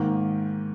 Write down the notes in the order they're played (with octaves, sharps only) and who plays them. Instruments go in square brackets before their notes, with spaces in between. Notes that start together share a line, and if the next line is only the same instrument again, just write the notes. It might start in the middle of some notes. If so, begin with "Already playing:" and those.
Already playing: [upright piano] G#2 D#3 A#3